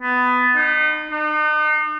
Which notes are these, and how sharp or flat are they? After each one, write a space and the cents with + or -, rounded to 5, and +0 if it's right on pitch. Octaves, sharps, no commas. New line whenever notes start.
B3 +15
D#4 -30
D#4 -40